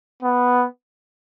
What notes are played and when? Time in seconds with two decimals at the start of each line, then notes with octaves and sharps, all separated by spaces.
0.23 B3